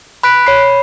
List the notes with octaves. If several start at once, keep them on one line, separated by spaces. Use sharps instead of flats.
B5 F#6 B6 D7
C#5 B5 C7